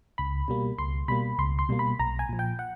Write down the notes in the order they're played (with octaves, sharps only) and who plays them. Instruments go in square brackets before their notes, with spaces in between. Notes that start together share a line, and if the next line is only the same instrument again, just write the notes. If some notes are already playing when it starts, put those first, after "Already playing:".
[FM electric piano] C#2 B5
B2 G3 A#3
C#2 C6
B2 G3 A#3 B5
C#2 C6
C6
B2 G3 A#3
B5
B1 A#5
G#5
A#2 F3
G5
F#5